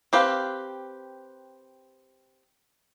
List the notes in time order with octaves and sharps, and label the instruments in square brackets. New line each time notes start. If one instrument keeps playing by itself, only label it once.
[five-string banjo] C4 G4 B4 F5